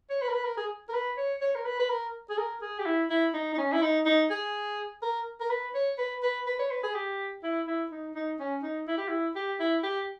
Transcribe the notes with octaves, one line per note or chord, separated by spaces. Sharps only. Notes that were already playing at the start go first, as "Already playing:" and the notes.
C#5
B4
A#4
B4
A#4
G#4
A#4
B4
C#5
C#5
A#4
B4
B4
A#4
G#4
A#4
G#4
G4
E4
E4
D#4
D#4
C#4
E4
D#4
D#4
G#4
A#4
A#4
B4
C#5
B4
B4
B4
C#5
B4
G#4
G4
E4
E4
D#4
D#4
C#4
D#4
E4
G4
E4
G4
E4
G4